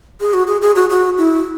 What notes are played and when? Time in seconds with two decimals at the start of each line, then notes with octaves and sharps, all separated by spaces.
0.21 G#4
0.34 F#4
0.47 G#4
0.62 G#4
0.75 F#4
0.90 F#4
1.18 E4